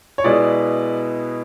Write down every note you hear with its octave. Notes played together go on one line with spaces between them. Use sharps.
C#5
B2 G#3 B3 E4 D5